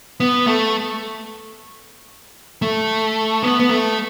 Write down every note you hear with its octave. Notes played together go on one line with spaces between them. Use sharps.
B3
A3
A3
B3
B3
A3